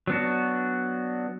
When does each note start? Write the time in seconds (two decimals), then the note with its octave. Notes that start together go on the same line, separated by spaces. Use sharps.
0.07 F#3 B3 D4 F#4